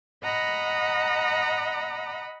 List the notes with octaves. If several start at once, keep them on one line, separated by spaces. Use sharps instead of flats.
D#5 F#5 A#5 B5